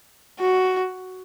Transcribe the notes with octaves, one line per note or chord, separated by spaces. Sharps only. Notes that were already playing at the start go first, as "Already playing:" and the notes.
F#4